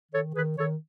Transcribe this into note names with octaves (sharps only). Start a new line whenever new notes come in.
D#3 A4 C#5
D#3 G#4 B4
D#3 A4 C#5